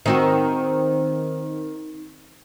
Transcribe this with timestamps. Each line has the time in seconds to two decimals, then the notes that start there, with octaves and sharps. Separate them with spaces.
0.06 D#3 C4 F#4